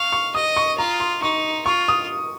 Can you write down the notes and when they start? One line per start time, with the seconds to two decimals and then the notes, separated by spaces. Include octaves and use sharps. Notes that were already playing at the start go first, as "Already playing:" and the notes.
Already playing: F5 C#6
0.12 C#6
0.35 D#5 D#6
0.57 C#6
0.78 F4 A#5
1.00 C6
1.22 D#4 C#6
1.66 F4 C#6
1.88 D#6